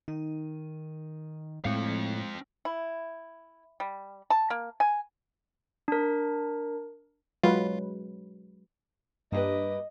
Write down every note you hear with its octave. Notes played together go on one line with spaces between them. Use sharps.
D#3 D#4
A2 G#3 C4 F5 C#7
E4
G3
A5
A#3
G#5
D4 A#4
F#3 G#3 F4 B4
G2 A#3 G4 B4 D#5